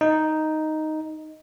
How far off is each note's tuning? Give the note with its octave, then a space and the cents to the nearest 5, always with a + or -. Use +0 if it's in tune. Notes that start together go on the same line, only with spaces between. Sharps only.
D#4 +0